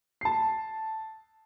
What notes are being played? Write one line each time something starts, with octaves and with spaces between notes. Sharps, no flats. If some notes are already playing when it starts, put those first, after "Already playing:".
A5 C7